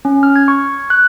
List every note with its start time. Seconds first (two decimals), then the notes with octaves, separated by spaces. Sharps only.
0.05 C#4
0.23 F6
0.36 G#6
0.48 C#6
0.90 F#6